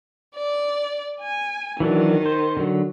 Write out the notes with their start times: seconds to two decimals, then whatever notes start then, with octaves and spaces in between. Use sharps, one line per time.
0.35 D5
1.21 G#5
1.80 D#3 E3 F#3 D4
2.26 C5
2.57 D3 F#3